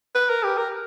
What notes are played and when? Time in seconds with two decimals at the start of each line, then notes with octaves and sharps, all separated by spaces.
0.15 B4
0.29 A#4
0.43 G4
0.57 A#4